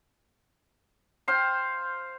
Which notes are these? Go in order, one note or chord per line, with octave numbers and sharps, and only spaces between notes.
C5 F5 G5